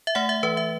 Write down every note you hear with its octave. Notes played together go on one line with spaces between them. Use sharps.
E5
A3 F#5
E5
E3 B4
E5